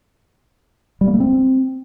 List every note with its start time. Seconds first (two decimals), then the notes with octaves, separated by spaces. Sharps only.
1.01 G3
1.07 A#3
1.14 A3
1.20 C4